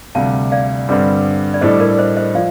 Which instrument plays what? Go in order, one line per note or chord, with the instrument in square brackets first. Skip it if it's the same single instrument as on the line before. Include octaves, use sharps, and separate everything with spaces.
[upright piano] D2 C3 G3 [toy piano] F5 A5
[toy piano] D5 F5
[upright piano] G2 D3 G3 C4
[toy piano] D5
[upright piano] A2 G3 D4 A4 [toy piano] C5 D#5
[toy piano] A#4 D5
C5 D#5
C5 D#5
[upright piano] F3 [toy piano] D5 F5